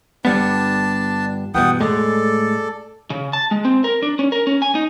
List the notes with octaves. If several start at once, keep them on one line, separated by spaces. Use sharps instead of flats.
G1 G3 B3 D4 A5
E2 G2 B2 F#5 G5 D#6
A2 G#3 A4 D5
C#3
A5
G#3
C4
A#4
D4
C#4
A#4
C#4
G#5
D#4